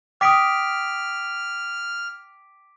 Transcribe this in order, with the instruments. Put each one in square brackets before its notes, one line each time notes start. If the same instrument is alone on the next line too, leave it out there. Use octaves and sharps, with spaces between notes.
[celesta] G5 D#6 [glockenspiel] D6 B6 D7 [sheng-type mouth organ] F6